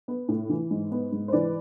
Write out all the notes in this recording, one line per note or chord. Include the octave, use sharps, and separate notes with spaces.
B3
A2
E3
G#2
B3
G#2
C5
E3 B4 D5